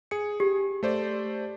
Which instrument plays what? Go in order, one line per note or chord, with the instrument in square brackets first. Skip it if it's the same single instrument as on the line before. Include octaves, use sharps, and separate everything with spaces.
[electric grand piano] G#4 C#7
[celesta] G4
[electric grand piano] A3 C5 D5